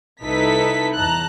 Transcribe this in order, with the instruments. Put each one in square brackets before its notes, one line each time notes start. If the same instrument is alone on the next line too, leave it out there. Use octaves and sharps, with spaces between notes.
[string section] C2 D#4 E4 A4 B4 B6
E2 A5 A#5 F#6